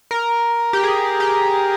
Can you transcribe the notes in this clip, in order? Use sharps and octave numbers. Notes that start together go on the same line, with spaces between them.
A#4
G4
G#4
G4